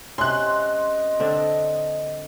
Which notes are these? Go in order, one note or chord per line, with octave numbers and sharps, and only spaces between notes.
C3 C#4 D#5 C6 F#6
D3 C4 D4